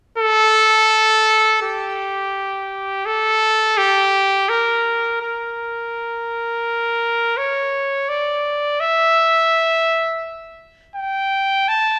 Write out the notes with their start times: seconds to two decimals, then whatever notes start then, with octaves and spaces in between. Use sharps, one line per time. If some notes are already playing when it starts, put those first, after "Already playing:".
0.18 A4
1.63 G4
3.06 A4
3.78 G4
4.49 A#4
5.21 A#4
7.38 C#5
8.09 D5
8.80 E5
10.96 G5
11.68 A5